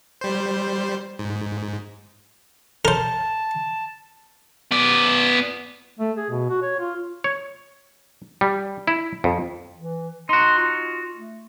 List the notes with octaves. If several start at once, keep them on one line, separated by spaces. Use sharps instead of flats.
G3 C5
G#2
A#4 C5 A5
B3 D5
A3
G#4
B2
F#4
C#5
F4
C#5
G3
E4
F2
E3
D#4 F#4 C6
F4
A3